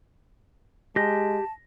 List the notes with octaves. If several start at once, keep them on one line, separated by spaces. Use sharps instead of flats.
G#3 G4 A5 G6 A#6